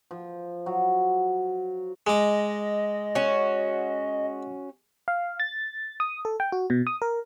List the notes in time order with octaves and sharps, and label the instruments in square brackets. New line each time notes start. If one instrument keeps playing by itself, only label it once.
[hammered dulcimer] F3
F#3
[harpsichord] G#3 D6 [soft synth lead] D#5
[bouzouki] C#4 F#4
[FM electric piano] F5
A6
D#6
A4
G5
F#4
B2
D#6
A#4